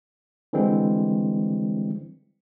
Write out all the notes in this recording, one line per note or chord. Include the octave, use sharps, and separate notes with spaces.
D3 E3 G3 G#3 C4